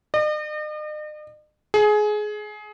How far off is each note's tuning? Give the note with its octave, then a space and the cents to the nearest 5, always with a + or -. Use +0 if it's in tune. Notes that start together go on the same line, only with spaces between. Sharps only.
D#5 -45
G#4 +20